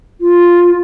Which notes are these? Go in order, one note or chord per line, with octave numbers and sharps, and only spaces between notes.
F4